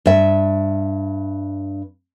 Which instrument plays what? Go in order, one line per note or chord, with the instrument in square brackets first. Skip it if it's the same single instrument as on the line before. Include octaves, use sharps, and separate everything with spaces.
[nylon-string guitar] G2 E5